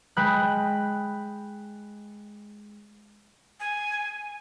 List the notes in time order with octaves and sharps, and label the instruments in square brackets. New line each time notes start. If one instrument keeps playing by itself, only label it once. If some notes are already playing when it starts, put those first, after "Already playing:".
[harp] G#3 G5 B5 F#6
[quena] G#5